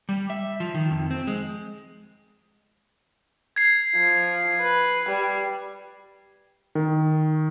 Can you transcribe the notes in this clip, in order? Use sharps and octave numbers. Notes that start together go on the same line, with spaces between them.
G3
E5
F3
D#3
F2
C4
G#3
G#6 C7
F3
B4
G3
D#3